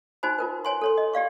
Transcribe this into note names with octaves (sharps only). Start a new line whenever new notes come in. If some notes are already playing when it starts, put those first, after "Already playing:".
D#4 F#4 C5 G#5 B5
F4 A#4 B4
C#5 G#5 C6
A4 C#5 C6
D#5
G4 D5 F5 C#6